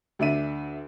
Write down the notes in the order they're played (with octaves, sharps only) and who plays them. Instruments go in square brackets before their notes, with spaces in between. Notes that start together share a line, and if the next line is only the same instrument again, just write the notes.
[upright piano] D2 D4 E5 D#7